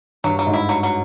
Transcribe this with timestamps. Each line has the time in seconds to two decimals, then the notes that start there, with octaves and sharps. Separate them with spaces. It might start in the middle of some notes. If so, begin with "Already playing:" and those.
0.24 G2 F#3
0.39 F#3
0.47 G#2
0.53 E4
0.69 F#3
0.83 F#3